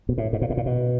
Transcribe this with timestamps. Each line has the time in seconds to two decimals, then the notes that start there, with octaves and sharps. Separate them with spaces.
0.09 B2
0.18 A2
0.33 G#2
0.42 A#2
0.50 A2
0.57 A#2
0.66 B2